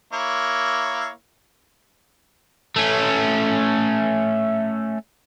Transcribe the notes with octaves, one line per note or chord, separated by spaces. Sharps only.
A#3 E4 C#5
A3 C#4